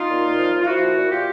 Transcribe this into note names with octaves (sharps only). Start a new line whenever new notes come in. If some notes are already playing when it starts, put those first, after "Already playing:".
Already playing: D#4 F4
A#2
A#2
F3
F3
F4
F3 E4 F#4
A#2
A#2
A#2 F4 G4